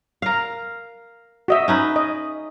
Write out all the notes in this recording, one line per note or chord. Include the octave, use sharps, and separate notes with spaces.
A#4 F5
F#4 D#5 E5
C#4 D#4 B4
D#5